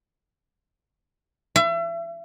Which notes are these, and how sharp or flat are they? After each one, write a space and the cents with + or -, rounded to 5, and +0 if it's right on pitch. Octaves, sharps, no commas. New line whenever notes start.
E5 +35